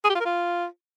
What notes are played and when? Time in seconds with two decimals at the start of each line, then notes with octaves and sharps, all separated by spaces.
0.04 G#4
0.10 G4
0.15 F4
0.20 A#4
0.25 F4